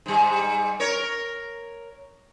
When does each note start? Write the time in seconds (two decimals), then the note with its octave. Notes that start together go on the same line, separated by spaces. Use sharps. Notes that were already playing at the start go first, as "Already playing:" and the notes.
0.06 G#2 G3
0.80 A#4 C#5